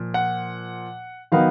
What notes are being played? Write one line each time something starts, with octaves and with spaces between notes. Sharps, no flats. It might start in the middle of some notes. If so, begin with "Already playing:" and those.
Already playing: A#2 F3
F#5
D#3 F#3 B3 D#4 F5